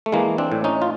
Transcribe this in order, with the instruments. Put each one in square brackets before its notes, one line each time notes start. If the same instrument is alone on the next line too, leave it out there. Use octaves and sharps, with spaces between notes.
[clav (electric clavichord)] A3
E3 G#3 A#3
C4 D4
A2
C#4 D#4
F4